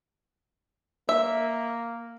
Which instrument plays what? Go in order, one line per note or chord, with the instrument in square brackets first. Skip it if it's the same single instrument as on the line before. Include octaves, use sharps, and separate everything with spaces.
[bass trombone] A#3 [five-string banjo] E5